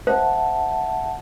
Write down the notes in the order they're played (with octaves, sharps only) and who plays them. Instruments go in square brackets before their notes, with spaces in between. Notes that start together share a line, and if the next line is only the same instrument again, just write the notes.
[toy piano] C5 [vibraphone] E5 F#5 A5